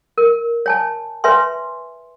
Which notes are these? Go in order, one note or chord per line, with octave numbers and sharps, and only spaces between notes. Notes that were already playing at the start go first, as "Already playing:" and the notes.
A#4
C#5 G#5 A5
B4 C#5 E5 G#5 C6